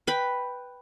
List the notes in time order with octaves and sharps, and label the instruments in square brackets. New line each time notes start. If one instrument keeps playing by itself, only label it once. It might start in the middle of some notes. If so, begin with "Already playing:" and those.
[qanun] B4 G5 B5